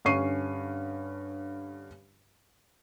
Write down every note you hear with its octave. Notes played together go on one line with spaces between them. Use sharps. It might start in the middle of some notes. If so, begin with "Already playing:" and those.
G2 D3 C#4 C#6 C7 D#7